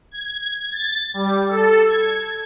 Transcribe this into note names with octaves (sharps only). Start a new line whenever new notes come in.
G#6
A6
G3
A4
G#6